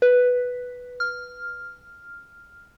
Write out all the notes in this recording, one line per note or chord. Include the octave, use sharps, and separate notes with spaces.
B4
F6